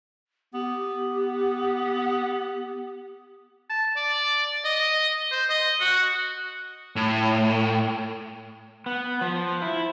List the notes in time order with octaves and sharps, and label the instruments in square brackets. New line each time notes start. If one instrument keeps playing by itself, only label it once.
[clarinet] B3 [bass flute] G4
[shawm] A5
D5
D#5
C5
D#5
F#4
[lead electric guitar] A2
[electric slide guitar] B3
F3
E4